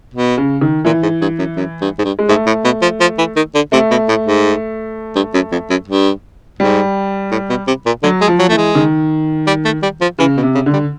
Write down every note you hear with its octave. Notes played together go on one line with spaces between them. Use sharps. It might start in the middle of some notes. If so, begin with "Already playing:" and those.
B2
C#3
D#3
A#2 E3
G#2
G2
F#2
F#2
G2
G#2
G2
G#3
G#2 A3
A2
B2
F3
F3
E3
D#3
D3
C3 A3
B2
A2
G#2
G2
F#2
F2
F#2
G2
G#2 G3
A2
B2
C3
A#2
D3 F#3
G#3
F3
F#3
E3 A3
G#3
D#3
G3
A3
G3
F3
C#3 E3
B2
C3
C#3
D3
G3